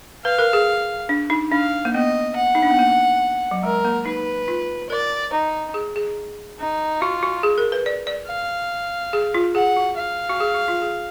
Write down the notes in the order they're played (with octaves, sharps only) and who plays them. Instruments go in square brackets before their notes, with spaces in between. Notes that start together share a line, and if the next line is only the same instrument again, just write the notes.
[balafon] B4 [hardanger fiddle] F5
[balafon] A#4
G#4
D4
D#4
[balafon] D4 [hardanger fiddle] F5
[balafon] A#3
[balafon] B3 [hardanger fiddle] D#5
[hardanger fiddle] F#5
[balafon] D#4
D4
B3
A#3
F#3
[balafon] G#3 [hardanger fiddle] A#4
[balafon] A#3
[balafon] D#4 [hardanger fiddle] B4
[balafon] F4
[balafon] A#4 [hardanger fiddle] D5
[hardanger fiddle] D#4
[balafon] G#4
G#4
[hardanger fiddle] D#4
[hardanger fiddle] F4 [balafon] F#4
[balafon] F#4
G#4
A#4
B4
D5
D5
[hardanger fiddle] F5
[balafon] G#4
F4
[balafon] G#4 [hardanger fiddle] F#5
[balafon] F#4
[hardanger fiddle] F5
[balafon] F#4
G#4
F#4
F4
G#4